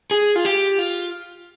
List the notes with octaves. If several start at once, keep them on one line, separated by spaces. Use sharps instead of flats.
G#4
F4
G4
F4